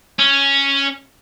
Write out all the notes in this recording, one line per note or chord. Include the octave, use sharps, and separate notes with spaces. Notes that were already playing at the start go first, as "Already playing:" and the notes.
C#4